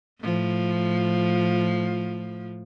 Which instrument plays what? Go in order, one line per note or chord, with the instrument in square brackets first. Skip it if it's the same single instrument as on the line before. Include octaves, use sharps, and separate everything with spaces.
[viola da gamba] A2 F3